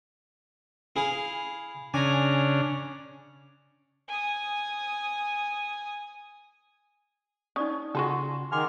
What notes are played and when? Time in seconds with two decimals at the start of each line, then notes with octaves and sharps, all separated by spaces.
0.96 E4 G#4 F5
1.94 C#3 D4 G#5 A#5
4.08 G#5 D#6
7.56 C#4 D#4 D5 D#6
7.95 C#3 D#4 F4 F#4 G#4 A4 C6
8.52 D#3 G#4 F#5 G#5 C6 D6 F6